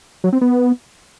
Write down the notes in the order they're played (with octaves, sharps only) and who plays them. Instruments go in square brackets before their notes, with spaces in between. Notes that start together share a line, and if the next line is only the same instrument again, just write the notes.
[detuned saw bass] F#3
C4
B3